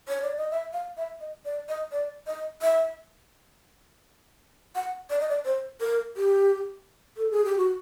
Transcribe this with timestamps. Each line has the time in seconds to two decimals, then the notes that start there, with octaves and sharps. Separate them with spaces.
0.08 C#5
0.22 D5
0.37 D#5
0.51 E5
0.73 F5
0.97 E5
1.20 D#5
1.45 D5
1.68 D#5
1.92 D5
2.27 D#5
2.62 E5
4.75 F#5
5.10 D5
5.20 D#5
5.29 D5
5.45 C5
5.80 A#4
6.17 G4
7.17 A4
7.31 G#4
7.45 G4
7.58 F#4